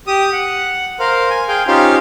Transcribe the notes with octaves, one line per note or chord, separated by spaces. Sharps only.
G4 D#6
F#5
A#4 C5 F5
G#5
G#4 F5 G5
C#4 D#4 F4 G4 C5 F5